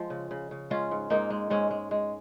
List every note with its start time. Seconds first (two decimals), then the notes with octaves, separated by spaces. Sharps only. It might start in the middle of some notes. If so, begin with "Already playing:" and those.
Already playing: F3 G#3
0.10 C#3
0.31 C#3
0.51 C#3
0.70 G#3 C#4 F4
0.91 G#2
1.10 G#2 A#3 D#4
1.30 G#3
1.50 G#2 G#3 C#4
1.71 G#3
1.91 G#3